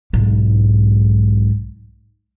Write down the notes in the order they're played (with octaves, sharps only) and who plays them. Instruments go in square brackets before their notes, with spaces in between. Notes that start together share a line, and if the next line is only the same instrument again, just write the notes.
[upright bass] B1 G#2